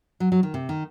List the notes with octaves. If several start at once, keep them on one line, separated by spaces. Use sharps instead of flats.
F#3
F#3
D#3
C3
D#3